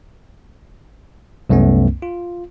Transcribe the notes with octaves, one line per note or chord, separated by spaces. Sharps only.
C2 F#2 A3 B3 C#4
F4